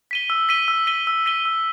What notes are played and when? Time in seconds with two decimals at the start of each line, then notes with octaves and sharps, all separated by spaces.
0.11 B6 D#7 G7
0.30 E6
0.49 B6 D#7 G7
0.68 E6
0.87 B6 D#7 G7
1.07 E6
1.26 B6 D#7 G7
1.45 E6